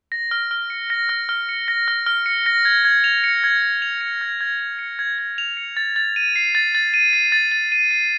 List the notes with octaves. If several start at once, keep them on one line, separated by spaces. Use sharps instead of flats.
A#6
F6
F6
C#7
A#6
F6
F6
C#7
A#6
F6
F6
C#7
A#6
G#6
G#6
F7
C#7
G#6
G#6
F7
C#7
G#6
G#6
F7
C#7
G#6
G#6
F7
C#7
A6
A6
D#7
C7
A6
A6
D#7
C7
A6
A6
D#7
C7